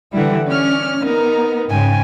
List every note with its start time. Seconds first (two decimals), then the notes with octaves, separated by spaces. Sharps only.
0.12 D3 E3 G3 E4 F#5
0.47 C#4 D5 F6
1.04 B3 D#4 A#4
1.69 G#2 C#3 G5 G#5